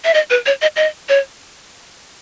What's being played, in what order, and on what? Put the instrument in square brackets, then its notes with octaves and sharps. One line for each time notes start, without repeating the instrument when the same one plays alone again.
[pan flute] E5
D#5
B4
C#5
D#5
D#5
C#5